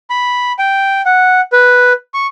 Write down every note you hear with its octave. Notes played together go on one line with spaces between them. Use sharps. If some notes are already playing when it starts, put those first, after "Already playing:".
B5
G5
F#5
B4
C#6